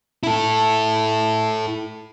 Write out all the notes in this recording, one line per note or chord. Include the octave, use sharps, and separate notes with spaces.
E4 A4